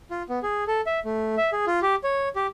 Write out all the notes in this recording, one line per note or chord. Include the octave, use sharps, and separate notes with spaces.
F4
B3
G#4
A4
E5
A3
E5
G#4
F4
G4
C#5
G4